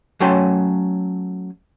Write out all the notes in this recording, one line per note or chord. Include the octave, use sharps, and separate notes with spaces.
F#3 A3 C#4 G5 C6